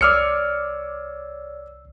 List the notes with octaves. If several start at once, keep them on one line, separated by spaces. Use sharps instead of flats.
C2 C#5 D5 D6 E6 F6 C7 C#7